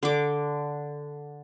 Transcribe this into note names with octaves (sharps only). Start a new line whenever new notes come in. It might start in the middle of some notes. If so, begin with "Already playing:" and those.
D3 D6